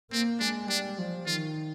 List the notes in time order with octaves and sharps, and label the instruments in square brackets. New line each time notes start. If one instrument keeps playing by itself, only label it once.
[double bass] A#3 [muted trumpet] C4
[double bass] G#3 [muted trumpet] D4
[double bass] G3 [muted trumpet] D4
[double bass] F3
[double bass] D#3 [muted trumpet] F4